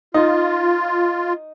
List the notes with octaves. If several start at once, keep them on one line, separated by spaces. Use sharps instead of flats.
D#4 F4